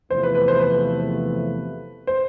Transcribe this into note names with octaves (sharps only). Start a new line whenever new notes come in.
E2 C3 F3 A3 C5
B4
B4
C5
B4
C5